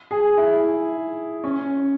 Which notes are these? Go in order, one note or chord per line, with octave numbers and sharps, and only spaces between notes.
G#4
E4
C#4